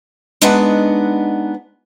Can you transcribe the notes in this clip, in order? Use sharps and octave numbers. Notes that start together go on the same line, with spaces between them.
G#3 B3 D4 D#4 B4 F#5